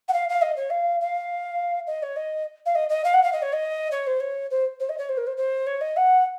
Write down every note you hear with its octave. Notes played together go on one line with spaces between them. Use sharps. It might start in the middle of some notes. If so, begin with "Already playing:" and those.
F#5
F5
F5
D#5
C#5
F5
F5
D#5
C#5
D#5
F5
D#5
D#5
F5
F#5
F5
D#5
C#5
D#5
C#5
C5
C#5
C5
C5
D#5
C#5
C5
A#4
C5
C5
C#5
D#5
F#5